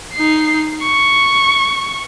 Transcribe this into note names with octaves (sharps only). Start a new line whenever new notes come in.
D#4 C7
C#6